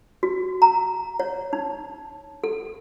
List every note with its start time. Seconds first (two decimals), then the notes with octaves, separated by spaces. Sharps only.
0.23 F#4
0.62 A#5
1.20 C#5
1.53 D#4
2.44 A4